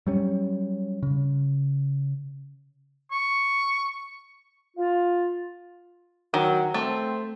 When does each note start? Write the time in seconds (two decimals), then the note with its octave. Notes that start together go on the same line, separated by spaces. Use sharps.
0.07 F#3 G3 C#4
1.03 C#3
3.12 C#6
4.77 F4
6.34 D#3 F#3
6.74 A3 C4